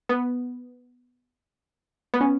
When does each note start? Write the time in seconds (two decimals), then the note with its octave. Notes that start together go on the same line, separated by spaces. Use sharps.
0.09 B3
2.14 B3
2.21 C#4